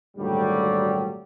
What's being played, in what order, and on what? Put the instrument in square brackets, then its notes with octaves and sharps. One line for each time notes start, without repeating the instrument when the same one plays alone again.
[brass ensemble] G#1 D2 A#2 F#3 G3